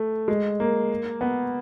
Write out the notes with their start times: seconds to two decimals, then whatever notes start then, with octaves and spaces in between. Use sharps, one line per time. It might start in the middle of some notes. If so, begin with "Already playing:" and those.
Already playing: A3
0.28 G#3
0.60 A#3
1.21 B3